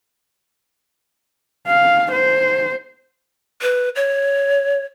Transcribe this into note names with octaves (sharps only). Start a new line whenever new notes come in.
F5
C5
B4
C#5